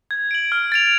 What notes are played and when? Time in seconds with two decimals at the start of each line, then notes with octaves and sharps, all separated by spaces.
0.11 G#6
0.31 D7 F#7
0.52 F6
0.72 A6 D7 F7